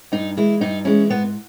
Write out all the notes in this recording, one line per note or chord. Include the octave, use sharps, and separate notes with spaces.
G2 D#4
E3 G#3 E4
G2 D#4
E3 G#3 C#4
G#2 B3